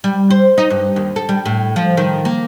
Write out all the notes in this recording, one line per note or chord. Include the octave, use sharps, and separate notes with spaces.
G3
C5
D#4
G2
D#2
A4
G3
A2
F3
D#3
A#3